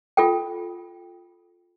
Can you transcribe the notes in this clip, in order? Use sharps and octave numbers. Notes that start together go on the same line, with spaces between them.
F4 A4 G5